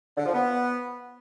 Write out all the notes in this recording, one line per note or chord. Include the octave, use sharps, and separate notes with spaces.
D3
F3
B3